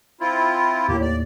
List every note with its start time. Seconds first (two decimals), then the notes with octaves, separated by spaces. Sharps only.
0.20 C4 E4 F4
0.88 D#2 A2 A#3 G4
1.02 D5